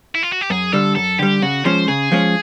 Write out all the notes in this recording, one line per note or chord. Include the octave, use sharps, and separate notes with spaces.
E4
F4
F#4
G4
F#2 G#4
D3 G3 A4
F#2 A4
D3 G3 G4
C#3 F#4
F3 G#3 C#4 C5
C#3 G#4
F3 G#3 C#4